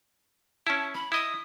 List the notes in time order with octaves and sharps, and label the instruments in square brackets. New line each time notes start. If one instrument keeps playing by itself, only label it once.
[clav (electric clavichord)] C#4 E4 [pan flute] A5
[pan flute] B5
[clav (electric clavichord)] E4 D#5 [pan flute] D#6